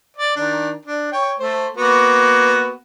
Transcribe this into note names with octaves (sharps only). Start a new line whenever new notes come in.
D5
D#3 D4
D4
C#5 G5
A3 C5
A#3 B3 F#4